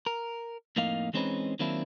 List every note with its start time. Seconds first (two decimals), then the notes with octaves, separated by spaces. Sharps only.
0.06 A#4
0.76 F2 A2 A#3 D#4 F5
1.13 E3 G#3 C4 C#4 D#4 B4
1.59 D#3 F#3 A#3 C4 D4 E4